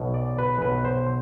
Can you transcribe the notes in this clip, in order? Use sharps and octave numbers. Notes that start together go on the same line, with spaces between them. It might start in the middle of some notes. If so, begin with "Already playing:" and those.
Already playing: B1 B2
D5
B4
B1 B2 B4
C5